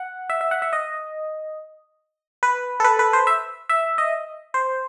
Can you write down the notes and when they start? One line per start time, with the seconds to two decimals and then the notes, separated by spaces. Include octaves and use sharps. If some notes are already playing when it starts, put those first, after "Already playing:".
Already playing: F#5
0.30 E5
0.41 E5
0.51 F#5
0.62 E5
0.73 D#5
2.43 B4
2.80 A4
2.84 B4
2.99 B4
3.13 C5
3.27 E5
3.69 E5
3.98 D#5
4.54 C5